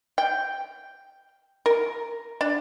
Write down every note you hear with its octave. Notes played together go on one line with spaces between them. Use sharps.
G5
A#4
D4